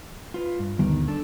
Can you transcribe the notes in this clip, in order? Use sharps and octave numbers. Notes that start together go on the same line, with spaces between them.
F4 B4
G2
D2 D#3 G3 B3
D4 A4